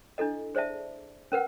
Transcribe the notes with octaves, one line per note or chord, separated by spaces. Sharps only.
D4 E4 A4 D#5
G#4 C5 D5 E5 A5
C#4 A#4 B4 F#5